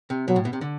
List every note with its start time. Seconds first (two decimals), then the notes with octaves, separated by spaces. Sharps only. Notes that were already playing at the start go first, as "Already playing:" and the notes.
0.10 C3
0.28 B2 F#3
0.36 A2
0.45 B2
0.53 C3
0.61 D3